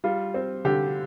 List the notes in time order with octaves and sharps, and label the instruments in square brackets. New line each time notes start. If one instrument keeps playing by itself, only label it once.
[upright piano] G3 F4
C4
D3 G4